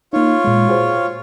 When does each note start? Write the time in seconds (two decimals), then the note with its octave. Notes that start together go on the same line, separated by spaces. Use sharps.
0.13 A#3 D#4 F4 C#5
0.45 A#2 G#3
0.68 F#4 G#4 C5